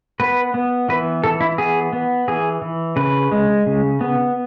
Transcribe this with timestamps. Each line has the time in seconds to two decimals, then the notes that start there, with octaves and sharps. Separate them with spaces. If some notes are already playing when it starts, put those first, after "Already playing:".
0.20 B3 B4
0.54 B3
0.89 E3 B4
1.24 E3 A4
1.40 E4
1.58 B3 G#4
1.92 B3
2.28 E3 G#4
2.62 E3
2.96 C#3 B4
3.32 G#3
3.66 C#3
4.01 B3